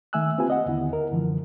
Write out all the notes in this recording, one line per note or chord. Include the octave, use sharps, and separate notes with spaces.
D#3 A3 E5 G#5 E6 F#6
A#3 C4 F4 G4 B4 G#5
D#5 F#5
D#2 D3 B3 E4
A#4
F#2 D3 E3 F3